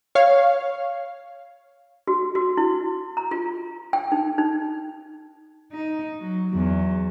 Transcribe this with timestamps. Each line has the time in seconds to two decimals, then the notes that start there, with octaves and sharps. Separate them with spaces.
0.15 C#5 F5
2.08 F#4
2.35 F#4
2.57 E4
3.17 A#5
3.31 F4
3.93 G5
4.12 D#4
4.38 D#4
5.72 D#4
6.20 F#3
6.50 E2 F#3